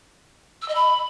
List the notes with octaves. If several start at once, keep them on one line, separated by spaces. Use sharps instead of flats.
E6
D#5
B5